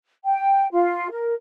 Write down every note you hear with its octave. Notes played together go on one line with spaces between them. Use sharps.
G5
F4
A#4